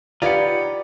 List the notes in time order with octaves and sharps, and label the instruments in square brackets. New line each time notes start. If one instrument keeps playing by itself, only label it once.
[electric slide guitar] D#4 C#5 F#5 [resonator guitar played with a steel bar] F4 G4 B4 [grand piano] D5